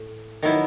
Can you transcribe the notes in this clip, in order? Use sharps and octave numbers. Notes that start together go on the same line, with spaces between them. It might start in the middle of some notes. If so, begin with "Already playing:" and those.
Already playing: A2
D#3 F#3 B3 E4